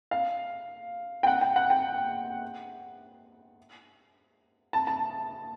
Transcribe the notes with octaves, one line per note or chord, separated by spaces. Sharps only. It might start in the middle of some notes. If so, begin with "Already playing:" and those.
F5
G5
F#5
G5
F#5
G5
A5
A5